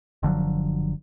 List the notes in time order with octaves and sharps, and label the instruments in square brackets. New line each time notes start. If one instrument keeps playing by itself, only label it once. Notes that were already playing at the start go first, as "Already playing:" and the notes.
[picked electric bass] F#1 D3 F3 F#3